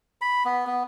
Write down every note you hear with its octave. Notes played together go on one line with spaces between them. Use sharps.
B5
B3
B3